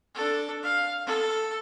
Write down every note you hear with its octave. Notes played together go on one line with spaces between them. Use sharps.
D4 A4
F5
A4